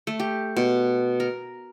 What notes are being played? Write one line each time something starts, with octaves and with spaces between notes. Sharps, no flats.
A3
G4
B2
A#4